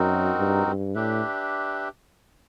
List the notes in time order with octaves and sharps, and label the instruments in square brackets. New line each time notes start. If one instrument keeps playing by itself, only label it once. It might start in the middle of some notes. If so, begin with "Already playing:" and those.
Already playing: [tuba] F#2 [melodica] C4 D#4 F#4 A#4
[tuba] G2
G2
[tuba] A2 [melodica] D4 G4 B4 E5